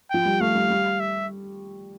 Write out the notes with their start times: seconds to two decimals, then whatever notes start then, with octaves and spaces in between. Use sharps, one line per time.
0.11 F3 G5
0.25 G3
0.40 A3 F5
0.55 G3
0.70 G3
1.00 E5